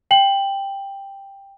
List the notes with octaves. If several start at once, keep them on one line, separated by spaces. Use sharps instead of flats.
G5 F#7